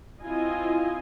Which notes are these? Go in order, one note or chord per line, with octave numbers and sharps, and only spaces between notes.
C4 E4 F4 D#5 G#5